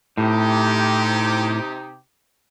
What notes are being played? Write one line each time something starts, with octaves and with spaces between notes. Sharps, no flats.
A2 C3 D#4 G4